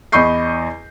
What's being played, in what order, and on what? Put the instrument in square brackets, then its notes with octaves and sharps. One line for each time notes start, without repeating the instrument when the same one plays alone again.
[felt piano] E2 D#5 B5 C#6 G6 C7